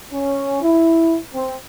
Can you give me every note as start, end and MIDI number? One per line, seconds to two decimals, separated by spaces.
0.12 0.60 61
0.62 1.18 64
1.34 1.54 60